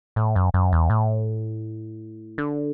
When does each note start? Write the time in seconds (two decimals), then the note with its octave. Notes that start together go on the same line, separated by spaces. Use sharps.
0.16 A2
0.36 F#2
0.54 F#2
0.73 E2
0.90 A2
2.38 D3